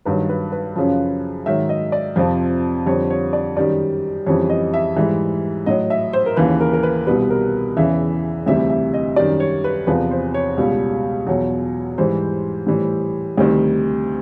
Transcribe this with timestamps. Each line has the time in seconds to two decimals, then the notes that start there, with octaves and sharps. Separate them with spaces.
0.05 G2 D#3 F#3 B4
0.29 B4
0.52 B4
0.76 F#2 C#3 F3
1.46 G#2 D#3 F#3 E5
1.69 D#5
1.92 D5
2.16 F2 C3 F3
2.86 F2 D3 G3 C#5
3.10 C#5
3.33 D5
3.56 F#2 D#3 G3 D5
4.26 F2 C#3 E3 G3 C#5
4.50 D#5
4.74 E5
4.96 G#2 E3 G3 E5
5.66 A2 F#3 D#5
5.90 E5
6.13 C5
6.26 A#4
6.36 D#2 C#3 E3 B4
6.61 A#4
6.73 A#4
6.83 B4
7.07 C2 B2 G3 B4
7.30 A#4
7.77 E2 C#3 E3 E5
8.46 D2 C3 E3 G3 E5
8.70 E5
8.94 D#5
9.16 F#2 D#3 G3 D5
9.40 C#5
9.64 B4
9.87 E2 C3 F3 B4
10.11 C5
10.34 C#5
10.57 C#2 B2 G3
11.27 E2 B2 F#3
11.98 G#2 E3 G3 C5
12.67 A2 E3 G3
13.38 D2 C3 D#3 G3